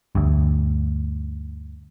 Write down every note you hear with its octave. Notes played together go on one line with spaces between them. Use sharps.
D2 G2